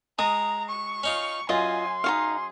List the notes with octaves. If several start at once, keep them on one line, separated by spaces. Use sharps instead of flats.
G#3 A#5 D#6
C#6
C#4 D#4 F4
F#2 F4 D#5 G#5 C6
D#4 F#4 G#4 F5